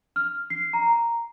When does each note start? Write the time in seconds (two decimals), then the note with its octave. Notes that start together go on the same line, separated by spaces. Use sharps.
0.16 F6
0.50 C7
0.73 A#5